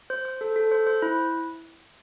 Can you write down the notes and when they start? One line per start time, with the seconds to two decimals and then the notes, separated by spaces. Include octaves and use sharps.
0.10 C5
0.25 C5
0.41 A4
0.56 A4
0.72 C5
0.87 C5
1.02 E4